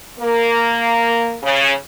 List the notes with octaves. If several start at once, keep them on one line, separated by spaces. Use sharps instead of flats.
A#3
C#3